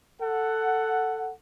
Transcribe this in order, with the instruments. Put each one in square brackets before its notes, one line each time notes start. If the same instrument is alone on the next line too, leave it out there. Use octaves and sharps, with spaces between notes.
[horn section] A4 F#5